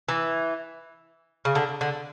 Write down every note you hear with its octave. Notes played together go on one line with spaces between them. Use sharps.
E3
C#3
D3
D3